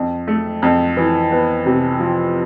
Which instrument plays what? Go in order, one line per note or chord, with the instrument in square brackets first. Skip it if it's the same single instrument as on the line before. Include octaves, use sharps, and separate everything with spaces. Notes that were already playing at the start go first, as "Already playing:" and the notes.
Already playing: [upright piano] F2
A3
F2
E3
B3
C3
F3